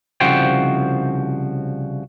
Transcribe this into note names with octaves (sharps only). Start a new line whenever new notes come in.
C2 C#3 F3 F#4 C5 G5